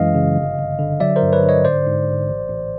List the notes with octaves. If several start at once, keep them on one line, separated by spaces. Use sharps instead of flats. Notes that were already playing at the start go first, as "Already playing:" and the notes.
Already playing: F#2 E3 G#3 D#5 F5
C#3
G1
G1
D3
F#3 D5 E5
A#4 C5
G2
B4 C#5
D3
C#5 D#5
G#2 C5 D5
G#2
A1
A1
A1